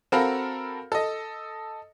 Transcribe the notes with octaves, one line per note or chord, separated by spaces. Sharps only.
C4 F#4 A4 A#4 F5 B5
A4 D#5